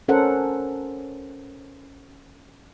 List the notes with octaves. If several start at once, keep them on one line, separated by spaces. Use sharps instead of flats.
C#4 A4 A#4 C5 F#5